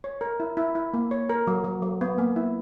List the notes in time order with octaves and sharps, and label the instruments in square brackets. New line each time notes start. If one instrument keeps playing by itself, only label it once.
[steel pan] C#5
A#4
E4
E4
E4
A#3
C#5
A#4
F#3
F#3
F#3
B3
A#3
E4